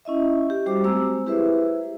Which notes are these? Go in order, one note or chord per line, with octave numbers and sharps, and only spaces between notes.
C#4 E4 D#5 E5
G4
G3 F#4 G4 C5 D6
G#3 A3 C4 C5 A#5 E6
E4 G4 G#4 B4 C5 E5